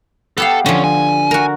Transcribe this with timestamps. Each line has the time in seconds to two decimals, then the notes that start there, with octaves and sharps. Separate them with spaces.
0.38 B3 G4 A4 F5
0.66 D3 F3 C#4
0.84 G#5
1.31 F#4 A#4